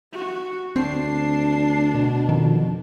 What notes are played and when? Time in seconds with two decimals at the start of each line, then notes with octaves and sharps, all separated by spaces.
0.13 F#4
0.76 D2 C4 D4 C7
1.94 B2
2.29 F2 D#3